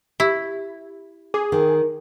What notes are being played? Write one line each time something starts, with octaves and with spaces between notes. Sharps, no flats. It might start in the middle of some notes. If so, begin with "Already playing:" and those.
E4 G4
G#4 D6
D#3